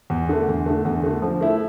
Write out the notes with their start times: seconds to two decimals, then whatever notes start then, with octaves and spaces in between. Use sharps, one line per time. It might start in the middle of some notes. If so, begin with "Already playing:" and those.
0.10 E2
0.29 D3 A3
0.48 E2
0.66 D3 A3
0.85 E2
1.04 D3 A3
1.22 F3
1.41 A3 E4